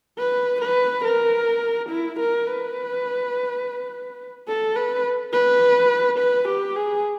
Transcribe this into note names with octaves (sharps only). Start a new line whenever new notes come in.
B4
B4
A#4
E4
A#4
B4
A4
B4
B4
B4
G4
G#4